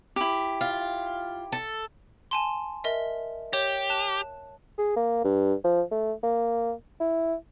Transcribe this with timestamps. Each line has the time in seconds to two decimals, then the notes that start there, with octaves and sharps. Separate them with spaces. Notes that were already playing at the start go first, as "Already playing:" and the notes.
0.16 E4 G4
0.61 F4
1.52 A4
2.31 G#5 A5 C6
2.84 A#4 D#5 E5
3.53 G4 C#5
3.90 A5 F#6 E7
4.78 G#4
4.96 A#3
5.24 G2
5.64 F3
5.91 A3
6.23 A#3
7.00 E4